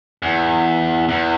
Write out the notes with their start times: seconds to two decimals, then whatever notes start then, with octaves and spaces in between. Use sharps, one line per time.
0.22 E2
1.09 E2